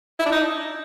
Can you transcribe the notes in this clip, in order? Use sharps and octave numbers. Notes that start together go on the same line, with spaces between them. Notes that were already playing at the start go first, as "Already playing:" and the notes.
E4
D4
D#4